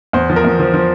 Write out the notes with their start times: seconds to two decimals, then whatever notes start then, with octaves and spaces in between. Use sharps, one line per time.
0.13 E2 C5
0.30 F3
0.36 A#4
0.44 E2
0.60 F3
0.74 F3